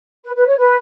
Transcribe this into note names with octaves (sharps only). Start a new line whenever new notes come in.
B4
B4
C#5
B4